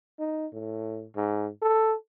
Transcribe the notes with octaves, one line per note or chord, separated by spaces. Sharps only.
D#4
A2
G#2
A4